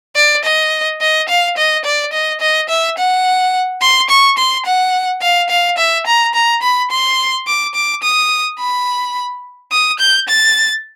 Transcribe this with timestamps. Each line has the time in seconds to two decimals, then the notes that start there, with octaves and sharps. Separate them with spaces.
0.16 D5
0.44 D#5
1.01 D#5
1.29 F5
1.57 D#5
1.85 D5
2.13 D#5
2.41 D#5
2.69 E5
2.97 F#5
3.81 C6
4.09 C#6
4.38 C6
4.66 F#5
5.22 F5
5.49 F5
5.78 E5
6.06 A#5
6.34 A#5
6.62 B5
6.91 C6
7.47 D6
7.75 D6
8.03 D#6
8.59 B5
9.71 D#6
9.99 G6
10.28 A6